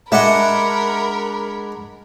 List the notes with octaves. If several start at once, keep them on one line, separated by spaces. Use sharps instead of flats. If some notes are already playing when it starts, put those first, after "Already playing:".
G#3 D4 A#4 D#5 E5 F#5 B5